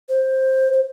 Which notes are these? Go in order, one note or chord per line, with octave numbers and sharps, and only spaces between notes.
C5
C5